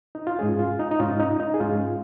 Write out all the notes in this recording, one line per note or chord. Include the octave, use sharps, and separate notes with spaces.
D#4
F4
G#2 G#3 C#4 G#4
F4
D#4
D#4
G#2 G#3 C#4 F4
D#4
D#4
G#4
G#2 G#3 C#4 F4